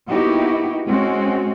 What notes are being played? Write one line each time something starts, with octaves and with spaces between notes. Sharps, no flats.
A#3 B3 D#4 E4 F#4 G4
G#3 C4 C#4 F#4